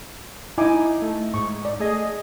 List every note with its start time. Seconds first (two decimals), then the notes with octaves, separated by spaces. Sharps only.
0.58 D#4 E4 G#5 D6
1.02 A3
1.34 G#2 C#6
1.65 D5
1.79 A3 G#4 D#5